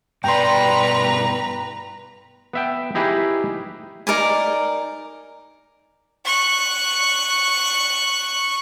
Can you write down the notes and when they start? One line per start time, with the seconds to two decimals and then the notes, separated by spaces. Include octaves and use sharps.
0.24 G2 B2 B4 D5 G5 A#5 C6
2.53 B3 E5 G5
2.95 D#4 E4 G4 G#4 B4
4.07 D#4 A#4 D5 G#5
6.25 C#6 F#6